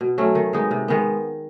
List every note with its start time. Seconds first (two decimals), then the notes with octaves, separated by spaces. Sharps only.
0.01 B2
0.18 F#3 A3 C#4
0.35 D#3
0.53 G#3 B3 D#4
0.71 C3
0.88 D#3 G#3 B3